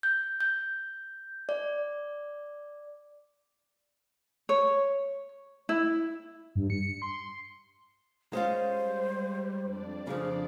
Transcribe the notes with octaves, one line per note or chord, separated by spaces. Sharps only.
G6
G6
D5
C#5
E4
G2
C#7
C6
G#3 C#4 F4 C5
G3
F2 D4 D5
C#3 F3 G#4